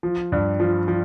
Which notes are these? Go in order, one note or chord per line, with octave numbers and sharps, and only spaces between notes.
F3
G2
F3
F3